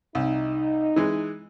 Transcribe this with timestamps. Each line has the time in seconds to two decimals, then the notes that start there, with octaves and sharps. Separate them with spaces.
0.15 C2 D#4
0.96 E3 G#3